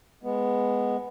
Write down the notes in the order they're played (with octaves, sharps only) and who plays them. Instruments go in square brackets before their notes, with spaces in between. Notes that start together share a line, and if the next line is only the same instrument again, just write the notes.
[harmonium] G#3 B3